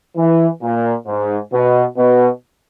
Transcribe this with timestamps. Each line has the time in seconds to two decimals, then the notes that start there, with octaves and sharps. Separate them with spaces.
0.17 E3
0.62 A#2
1.07 G#2
1.53 B2
1.97 B2